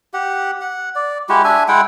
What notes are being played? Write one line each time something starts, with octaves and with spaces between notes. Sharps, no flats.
G4 F#5
F#5
D5
G#3 E4 F#4 G4
D4 E5 G#5
G#3 E4 F#5 G5